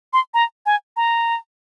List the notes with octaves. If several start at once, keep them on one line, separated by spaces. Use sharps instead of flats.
C6
A#5
G#5
A#5